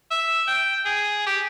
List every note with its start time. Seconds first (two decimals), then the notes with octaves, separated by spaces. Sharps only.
0.11 E5
0.48 G5
0.85 G#4
1.27 G4